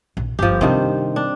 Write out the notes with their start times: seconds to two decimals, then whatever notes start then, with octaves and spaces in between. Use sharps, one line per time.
0.17 A#1
0.39 G1 D#3 F3 G4
0.61 G2 C3 D#3 C4
1.16 D4